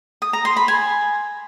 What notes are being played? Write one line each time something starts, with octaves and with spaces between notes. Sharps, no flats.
D#6
A#5
C6
B5
G#5